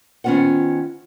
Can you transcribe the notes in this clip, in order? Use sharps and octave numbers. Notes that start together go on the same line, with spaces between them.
D#3 B3 C#4 F4 C5 F#5